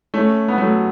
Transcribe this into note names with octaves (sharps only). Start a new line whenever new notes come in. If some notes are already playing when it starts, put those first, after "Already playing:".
A3 C#4
B3
F#3 A3